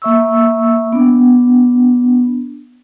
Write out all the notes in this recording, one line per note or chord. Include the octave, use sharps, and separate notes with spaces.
A#3 E5 C#6 E6
B3 D4